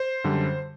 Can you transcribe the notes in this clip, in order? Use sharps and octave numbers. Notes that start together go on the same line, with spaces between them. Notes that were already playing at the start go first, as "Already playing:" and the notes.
Already playing: C5
F#2 D3 G3